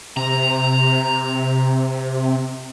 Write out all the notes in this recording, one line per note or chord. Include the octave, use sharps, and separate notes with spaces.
C3 A#5